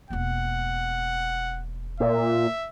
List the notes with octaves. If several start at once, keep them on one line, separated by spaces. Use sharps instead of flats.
E1 A#3 F#5
A#2 E5